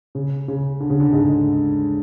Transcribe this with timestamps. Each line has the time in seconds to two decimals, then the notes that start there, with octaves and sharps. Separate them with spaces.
0.15 C#3
0.48 C#3
0.80 D3
0.90 C#3
1.00 D3
1.13 G#2 G#3